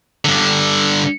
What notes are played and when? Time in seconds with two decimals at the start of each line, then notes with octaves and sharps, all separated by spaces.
0.25 G2 D3